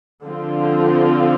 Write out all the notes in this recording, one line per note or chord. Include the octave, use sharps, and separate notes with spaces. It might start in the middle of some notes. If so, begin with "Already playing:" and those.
D3 F3 C4 F4